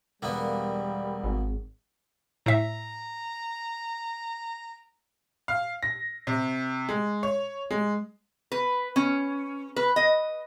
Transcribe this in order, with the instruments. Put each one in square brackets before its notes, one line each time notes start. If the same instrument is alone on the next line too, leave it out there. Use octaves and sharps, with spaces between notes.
[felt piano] E1 [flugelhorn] G3 [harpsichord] A#3 B3
[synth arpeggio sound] G#1
[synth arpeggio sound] A2 E5 [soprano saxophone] A#5
[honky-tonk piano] F5
A#6
C3
G#3
C#5
G#3
[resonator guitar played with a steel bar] B4
C#4
B4
D#5